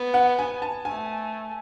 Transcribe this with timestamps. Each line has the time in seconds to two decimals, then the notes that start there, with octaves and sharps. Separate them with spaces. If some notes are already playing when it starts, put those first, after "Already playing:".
Already playing: B3
0.14 F#5
0.39 G#5
0.62 A5
0.85 A3 G#5